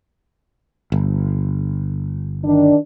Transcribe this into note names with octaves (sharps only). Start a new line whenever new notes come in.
G1
D#3 D4